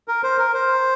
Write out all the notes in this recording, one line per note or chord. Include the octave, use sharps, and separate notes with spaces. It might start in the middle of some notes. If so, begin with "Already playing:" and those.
A#4
C5
A#4
C5